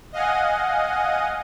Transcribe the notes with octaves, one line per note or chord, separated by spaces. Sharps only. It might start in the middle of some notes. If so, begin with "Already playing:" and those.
D#5 F5 F#5 G#5